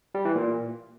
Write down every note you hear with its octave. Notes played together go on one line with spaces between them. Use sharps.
G3
E3
A#2